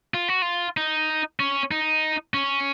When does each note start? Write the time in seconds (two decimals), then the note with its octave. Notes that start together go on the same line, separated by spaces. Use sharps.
0.14 F4
0.28 F#4
0.42 F4
0.77 D#4
1.40 C#4
1.71 D#4
2.34 C#4